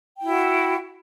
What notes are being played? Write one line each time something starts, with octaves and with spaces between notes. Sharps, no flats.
E4 F#4 F#5 G5